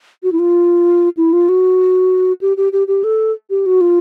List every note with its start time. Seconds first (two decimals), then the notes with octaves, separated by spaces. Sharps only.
0.23 F#4
0.32 E4
0.39 F4
1.17 E4
1.33 F4
1.49 F#4
2.41 G4
2.57 G4
2.72 G4
2.87 G4
3.04 A4
3.50 G4
3.66 F#4
3.81 F4